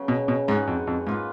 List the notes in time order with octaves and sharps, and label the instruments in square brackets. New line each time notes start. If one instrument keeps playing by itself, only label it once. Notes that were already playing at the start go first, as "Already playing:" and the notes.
Already playing: [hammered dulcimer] C#3 F#3 B3 C#4
[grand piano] B2
B2
[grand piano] G#2 [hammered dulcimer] G#3 D#4 F#4 B4
[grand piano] F2
F2
[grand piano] G#2 [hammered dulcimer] A#3 F4 B4